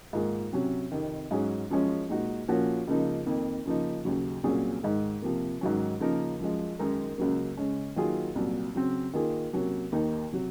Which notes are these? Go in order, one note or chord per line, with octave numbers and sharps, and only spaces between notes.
G#2 D#3 A#3 F4 G#4
C3 F#3 C#4
F2 C3 D#3
G#2 F#3 C#4 G#4
F#2 F3 G#3 C#4
A#2 G#3 D#4 F#4
A#2 F3 A#3 C#4 F#4
C#2 C#3 F3 A#3 D#4
F2 D#3 A#3
C#3 F3 A#3 D#4
D#2 C#3 F#3
C2 A#2 F#3 C#4 G#4
G#2 D#3 G#3
C3 F3 A#3
G#2 D#3 F#3 C#4
C#3 F3 A#3 D#4 A#4
F#2 F3 G#3
F#2 D#3 G#3 D#4 A#4
C#2 C#3 F#3 A#3
C#3 G#3 C#4
D#3 F#3 A#3 F4 G#4
C2 A#2 F#3
C#3 F#3 C4
D#3 A#3 F4 G#4
C3 F#3 A#3 C#4
D#2 D#3 A#3 D#4
C3 F#3